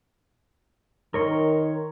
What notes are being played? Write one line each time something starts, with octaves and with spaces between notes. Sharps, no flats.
D#3 A#4 C#5 C6